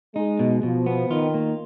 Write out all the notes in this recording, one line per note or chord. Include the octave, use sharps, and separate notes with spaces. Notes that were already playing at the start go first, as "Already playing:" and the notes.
G#3 D#4
B2
B2 F3
B3
D#3 F4
A#3